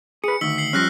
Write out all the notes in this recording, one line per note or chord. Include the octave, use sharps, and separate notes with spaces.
G#4 B4 C#7
D2 D#3 E6 B6 F#7
C7 F#7
F3 G3 C#4 F6 F#6 A#6